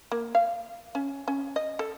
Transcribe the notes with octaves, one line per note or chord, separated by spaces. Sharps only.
A#3
F5
C#4
C#4
D#5
A4